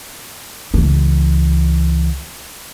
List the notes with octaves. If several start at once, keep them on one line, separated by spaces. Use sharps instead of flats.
C#2 E3